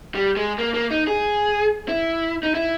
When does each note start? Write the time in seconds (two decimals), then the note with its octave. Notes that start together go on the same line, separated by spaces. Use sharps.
0.15 G3
0.37 G#3
0.58 A#3
0.74 A#3
0.91 D#4
1.07 G#4
1.88 E4
2.43 D#4
2.55 E4